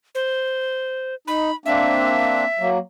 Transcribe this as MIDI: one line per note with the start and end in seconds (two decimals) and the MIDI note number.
0.15 1.15 72
1.28 1.51 63
1.28 1.55 83
1.66 2.45 58
1.66 2.45 60
1.66 2.45 62
1.66 2.69 76
2.59 2.78 54
2.59 2.78 58